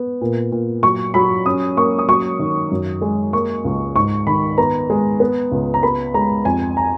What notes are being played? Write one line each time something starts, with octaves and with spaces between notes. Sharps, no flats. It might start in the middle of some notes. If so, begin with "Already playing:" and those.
Already playing: B3
A#2
A#2
F#3 C#6
F#3 B5
C#4 D#6
A#3 C#6
D#6
F#3 C#6
D#3
F#2
G#3
A#3 C#6
C#2
G#2 C#6
D#3 B5
B3 A#5
G#3
B3
C#2
A#5
B3 B5
G#3 A#5
F2 G#5
A#5